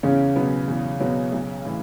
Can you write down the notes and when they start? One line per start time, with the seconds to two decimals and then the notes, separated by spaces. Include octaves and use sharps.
0.03 E2 C#3 C#4
0.36 B2 F#3 B3
0.68 E2
1.00 B2 F#3 B3
1.32 B1
1.65 A2 E3